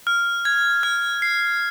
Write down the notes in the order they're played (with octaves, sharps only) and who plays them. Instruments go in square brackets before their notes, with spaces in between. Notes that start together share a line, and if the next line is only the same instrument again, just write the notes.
[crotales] F6
G#6
F6
C7